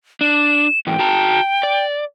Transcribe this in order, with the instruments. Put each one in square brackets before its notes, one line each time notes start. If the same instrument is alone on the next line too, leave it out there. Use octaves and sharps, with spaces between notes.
[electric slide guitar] D4 [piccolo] E7
[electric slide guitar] G#2 E3 [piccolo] G5
[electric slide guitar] F#4 A5 A#5
D5